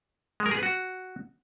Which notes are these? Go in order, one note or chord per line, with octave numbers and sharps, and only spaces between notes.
G#3
A#4
G#4
B4
F#4